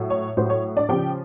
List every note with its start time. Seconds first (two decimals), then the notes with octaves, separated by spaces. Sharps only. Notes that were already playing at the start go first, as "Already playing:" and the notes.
Already playing: A2 F#3
0.10 C#5
0.37 A2 F#3 C5
0.50 C#5
0.77 D4 D5
0.89 C#3 F3 G4 G5